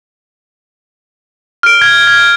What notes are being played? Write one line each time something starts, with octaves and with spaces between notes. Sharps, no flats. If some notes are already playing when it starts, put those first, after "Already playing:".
F6 D7
G#6
G#6